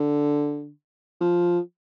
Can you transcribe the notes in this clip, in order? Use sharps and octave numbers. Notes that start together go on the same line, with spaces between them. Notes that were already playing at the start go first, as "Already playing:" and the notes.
Already playing: D3
F3